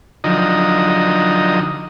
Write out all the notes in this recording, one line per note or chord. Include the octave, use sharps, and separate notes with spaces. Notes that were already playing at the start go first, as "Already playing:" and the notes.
D3 F3 F#3 D#4 D#5 A#5